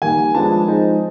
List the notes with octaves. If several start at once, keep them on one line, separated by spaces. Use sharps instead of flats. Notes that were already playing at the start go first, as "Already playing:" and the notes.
D#3 G3 A#3 G#5
F3 G#3 B3 D4 F4 A5
F3 G#3 C4 D#4